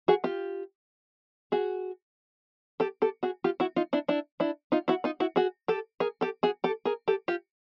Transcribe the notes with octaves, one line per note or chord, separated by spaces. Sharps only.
F#4 G#4
F4 G4
F#4 G#4
G4 A4
G4 A4
F#4 G#4
F4 G4
E4 F#4
D#4 F4
D4 E4
D4 E4
D4 E4
D#4 F4
E4 F#4
D#4 F4
E4 F#4
F#4 G#4
G4 A4
G#4 A#4
G4 A4
F#4 G#4
G4 A4
G#4 A#4
G4 A4
F4 G4